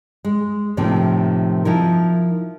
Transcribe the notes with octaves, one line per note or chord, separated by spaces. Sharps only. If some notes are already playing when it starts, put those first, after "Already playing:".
G#3
F2 A2 C3 D#3 F3 A#3
F3 D#4 E4 A#4